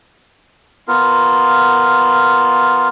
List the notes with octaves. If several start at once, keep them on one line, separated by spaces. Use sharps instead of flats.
B3 F4 A#4